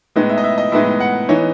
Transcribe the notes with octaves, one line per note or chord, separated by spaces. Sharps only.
A2 G#3 B3 D#4
E5
D#5
E5
D#5
A2 G#3 B3 D#4 E5
F#5
E3 B3 D#4 C#5